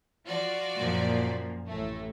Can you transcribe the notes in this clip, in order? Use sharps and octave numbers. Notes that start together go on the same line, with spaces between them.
F3 F4 F#4 D5
F#2 A#2 F3
A1 A2 A3